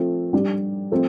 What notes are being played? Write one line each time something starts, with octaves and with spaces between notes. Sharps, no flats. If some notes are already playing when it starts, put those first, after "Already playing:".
Already playing: F3 A3 C4
G3 D4 G4
F3 A3 C4